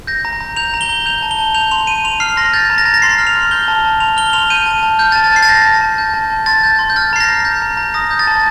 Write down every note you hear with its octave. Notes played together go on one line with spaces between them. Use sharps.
G6 A#6
A#5
A#5
G6 F7
A#5
G7
A#5
G6 F7
A5
G7
A5
G6 F7
C6 F7
C6 D#7
C6 F7
F6 C7
C6 A#6
G6 A6
A#5
A#6
A#5 A6
A#6
C6 C7
F6
F7
C6
G6 G7
A5
A5
C6 F7
F6 G7
C6 F7
G6 D#7
A5
A5
F6 G6
A6
A5
A6
A5 C7
A6
G6 A#6
A5
A5
G6
A5
A5
C6 A6
G6
C6
G6
F6 A6
A#5 C7
A#6
A#5
G6
A#5
A#5
D#6 A#6
G6
A6
A5